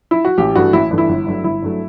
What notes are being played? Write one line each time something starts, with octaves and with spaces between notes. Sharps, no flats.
E4
F#4
A1 G4
G2 E3 A3 F#4
A1 E4
G2 E3 A3
E4
G1
G2 F#3 A3
G1 E4
G2 F#3 A3